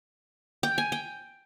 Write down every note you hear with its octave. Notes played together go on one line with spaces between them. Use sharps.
G5
G#5
G5